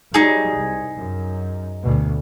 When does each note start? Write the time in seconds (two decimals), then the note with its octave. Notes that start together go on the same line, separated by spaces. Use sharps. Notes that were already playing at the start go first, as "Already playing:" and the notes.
0.14 F#3 G3 D#4 G#4
0.58 C2
0.97 F#2
1.84 D2 B2